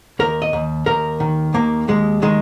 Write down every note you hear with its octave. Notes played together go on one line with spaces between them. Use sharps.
D#2 A#4
D#5
D#2
D#2 A#4
D#3
D#2 A#3
D#2 G#3
D#3 G#3